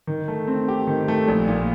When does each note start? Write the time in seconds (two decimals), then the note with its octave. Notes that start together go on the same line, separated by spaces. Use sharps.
0.07 D#3
0.28 A3
0.47 C4
0.68 G4
0.87 D#3
1.08 A3
1.28 A#1
1.48 A#2